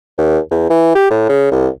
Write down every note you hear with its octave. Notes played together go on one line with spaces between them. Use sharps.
D#2
E2
E3
G4
A2
C#3
C2